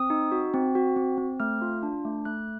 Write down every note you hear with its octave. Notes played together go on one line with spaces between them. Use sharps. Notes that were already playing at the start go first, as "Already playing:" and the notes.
Already playing: C4 D#6
D#4
F#4
C4
F#4
C4
C4
A3 F6
F4
D4
A3
A3 F#6